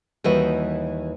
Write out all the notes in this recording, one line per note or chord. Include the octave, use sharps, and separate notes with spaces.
D#2 E3 G3 F#4 B4 D#5